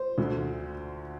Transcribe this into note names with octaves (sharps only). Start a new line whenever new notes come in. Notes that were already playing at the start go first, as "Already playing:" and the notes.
Already playing: C5
D2 D3